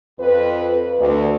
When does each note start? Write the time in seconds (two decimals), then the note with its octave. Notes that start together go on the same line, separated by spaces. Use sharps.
0.19 F2 B4
0.98 D2